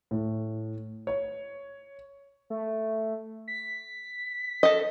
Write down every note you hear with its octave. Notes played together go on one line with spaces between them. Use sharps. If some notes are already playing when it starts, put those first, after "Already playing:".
A2
C#5
A3
B6
A4 D#5